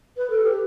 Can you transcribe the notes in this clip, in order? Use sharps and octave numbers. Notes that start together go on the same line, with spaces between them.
B4
A4
G4